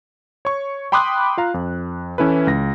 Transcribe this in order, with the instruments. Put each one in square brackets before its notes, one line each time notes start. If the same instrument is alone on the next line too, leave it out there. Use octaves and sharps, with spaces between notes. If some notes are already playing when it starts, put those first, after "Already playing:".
[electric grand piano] C#5 C#6
G5 B5 C6 D6 D#6 F#6
F4 F5 A#5
F2
E3 C#4 E4 A4 B4
C#2 A#6